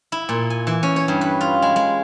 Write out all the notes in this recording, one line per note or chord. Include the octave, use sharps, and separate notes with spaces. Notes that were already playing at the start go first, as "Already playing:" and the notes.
E4
A#2
G#5
E3
C#4
C#5
G2
B4
F4
G#3
G#3